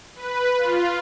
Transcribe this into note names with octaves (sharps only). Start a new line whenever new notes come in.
B4
F4